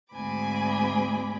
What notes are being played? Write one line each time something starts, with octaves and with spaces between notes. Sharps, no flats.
D2 G#2 C4 G#5 B5 D6